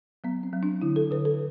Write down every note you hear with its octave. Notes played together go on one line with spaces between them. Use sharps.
F#3 B3
C4
F#3
D4
D3 E4
A4
D3 B4
A4